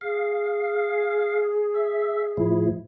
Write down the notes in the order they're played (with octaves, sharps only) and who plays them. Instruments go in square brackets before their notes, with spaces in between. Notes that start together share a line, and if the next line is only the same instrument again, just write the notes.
[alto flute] G#4 [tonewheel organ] F5
[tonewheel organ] E5
A2 F3 E4